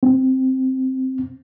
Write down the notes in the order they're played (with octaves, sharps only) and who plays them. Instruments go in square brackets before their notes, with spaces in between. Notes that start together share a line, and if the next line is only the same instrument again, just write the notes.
[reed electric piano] C4